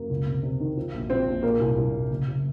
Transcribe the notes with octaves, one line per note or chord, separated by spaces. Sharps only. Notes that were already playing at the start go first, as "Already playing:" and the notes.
Already playing: F#2 A#3
C#2
C3
C3
D#3
F3
A#1
F3 C4
A#1
A#2 A#3
C2
C2
C2
F#1
F#1